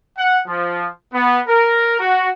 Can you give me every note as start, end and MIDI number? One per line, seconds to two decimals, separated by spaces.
0.17 0.38 78
0.46 0.87 53
1.13 1.39 59
1.47 1.98 70
2.00 2.28 66